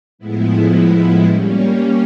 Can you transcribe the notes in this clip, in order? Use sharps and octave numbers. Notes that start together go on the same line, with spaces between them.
A2 F3 G#3 B3 E4
G3 A#3 C#4